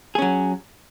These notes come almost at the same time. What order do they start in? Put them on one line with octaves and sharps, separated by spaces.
G#4 C#4 F#3